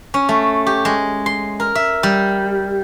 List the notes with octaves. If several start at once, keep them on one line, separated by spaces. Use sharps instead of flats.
C#4
A3
G4
G#3
C6
A#4
E5
G3